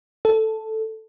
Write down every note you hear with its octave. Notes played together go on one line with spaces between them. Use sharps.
A4